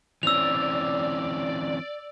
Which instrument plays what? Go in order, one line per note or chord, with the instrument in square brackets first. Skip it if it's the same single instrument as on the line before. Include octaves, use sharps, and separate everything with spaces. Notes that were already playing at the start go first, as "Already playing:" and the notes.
[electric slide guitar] E3 C4 C#4 [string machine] D5 [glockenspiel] E6 F7